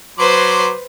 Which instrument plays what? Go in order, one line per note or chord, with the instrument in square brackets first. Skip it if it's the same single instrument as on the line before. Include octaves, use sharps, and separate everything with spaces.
[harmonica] F#3 C6 D6 [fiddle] B4 C5